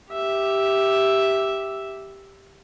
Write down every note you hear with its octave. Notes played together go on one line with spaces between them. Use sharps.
G4 E5